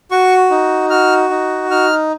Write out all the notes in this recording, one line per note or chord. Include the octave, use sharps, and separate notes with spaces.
F#4 C#6
D#4
F#4 F6
D#4
D#4 F6